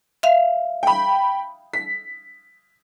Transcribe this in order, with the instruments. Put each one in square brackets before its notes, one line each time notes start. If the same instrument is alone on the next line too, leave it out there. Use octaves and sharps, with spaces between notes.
[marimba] E5 F5
[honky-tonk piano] G5 B5
B6